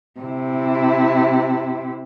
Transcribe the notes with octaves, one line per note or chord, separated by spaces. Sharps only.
C3 E4